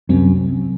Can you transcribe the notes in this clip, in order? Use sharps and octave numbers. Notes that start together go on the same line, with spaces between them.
C2 F#2 C3 F#3 C4